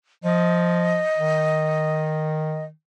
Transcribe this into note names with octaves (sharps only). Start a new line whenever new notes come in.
F3 D#5
D#3